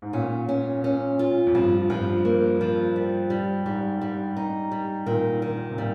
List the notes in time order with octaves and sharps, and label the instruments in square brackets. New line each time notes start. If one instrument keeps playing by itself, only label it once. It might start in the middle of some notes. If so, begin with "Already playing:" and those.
[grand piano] G#2
[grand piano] A#2 [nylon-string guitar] C#4
[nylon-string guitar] C#4
C#4
F4
[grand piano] F2
[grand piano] G2 [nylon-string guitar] F3
[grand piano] G2 [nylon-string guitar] F3
[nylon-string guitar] A#3
F3
G3
G3
[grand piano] G#2 [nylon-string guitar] G3
[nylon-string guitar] G3
D#4
G3
[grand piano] A#2 [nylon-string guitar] D#3
[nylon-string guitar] D#3
[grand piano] C3
[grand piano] A#2 [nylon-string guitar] G3